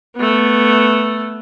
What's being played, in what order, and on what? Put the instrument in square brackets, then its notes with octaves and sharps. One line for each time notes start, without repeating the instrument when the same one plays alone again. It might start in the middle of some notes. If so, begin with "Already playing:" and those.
[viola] A3 B3